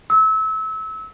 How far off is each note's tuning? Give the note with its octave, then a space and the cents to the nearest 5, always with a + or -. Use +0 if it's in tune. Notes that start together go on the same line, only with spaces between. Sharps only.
E6 -30